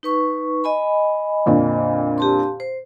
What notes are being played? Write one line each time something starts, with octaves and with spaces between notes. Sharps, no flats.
D#4 B4 C#6
D#5 G#5 B5
F2 A#2 D3
G4 A5 C6
C5